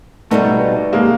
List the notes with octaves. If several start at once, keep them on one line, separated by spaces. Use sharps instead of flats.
B2 G3 A3 B3 D#4
G#3 A#3